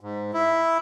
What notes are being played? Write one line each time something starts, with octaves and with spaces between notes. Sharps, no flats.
G#2
E4